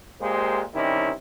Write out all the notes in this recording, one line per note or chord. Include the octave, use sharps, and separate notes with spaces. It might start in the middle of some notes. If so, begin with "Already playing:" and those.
A#2 G#3 A#3 G4 C5
C3 D#3 G3 C#4 D#4 E4